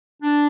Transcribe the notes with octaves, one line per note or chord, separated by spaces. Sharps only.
D4